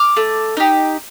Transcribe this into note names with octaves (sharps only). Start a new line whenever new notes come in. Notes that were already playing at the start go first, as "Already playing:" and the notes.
Already playing: D6 F6
A3
D#4 G4